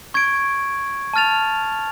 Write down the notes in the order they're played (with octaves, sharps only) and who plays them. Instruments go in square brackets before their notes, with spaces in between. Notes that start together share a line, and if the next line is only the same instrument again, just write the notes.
[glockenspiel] C#6 G#6 D7
A5 F6 A6 F7